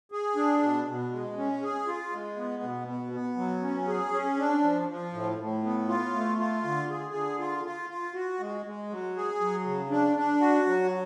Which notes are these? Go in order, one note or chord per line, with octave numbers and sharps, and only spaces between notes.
G#4
D4
B2
B2
G#3
C#4
G#4
F4
G#3
B3
B2
B3
B3
F#3
C#4
G#4
C#4
D4
F3
F3
A2
A2
B3
F4
A3
F4
D3
G#4
D3
F4
F4
F4
F#4
G#3
G#3
F#3
G#4
F#3
C#3
D4
D4
F#4
F#3